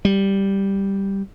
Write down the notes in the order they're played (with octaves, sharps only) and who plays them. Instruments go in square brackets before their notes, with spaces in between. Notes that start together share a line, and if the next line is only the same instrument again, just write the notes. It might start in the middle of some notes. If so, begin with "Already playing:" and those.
[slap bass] G3